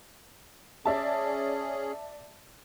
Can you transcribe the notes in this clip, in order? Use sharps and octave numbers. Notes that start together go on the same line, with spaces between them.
C#4 G#4 D5 E5 A5